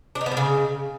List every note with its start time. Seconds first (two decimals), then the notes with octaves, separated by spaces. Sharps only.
0.15 D4
0.21 D#4
0.26 B3
0.31 G3
0.37 C#3